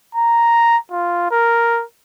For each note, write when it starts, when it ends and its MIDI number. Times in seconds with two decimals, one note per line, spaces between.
0.15 0.77 82
0.91 1.26 65
1.31 1.83 70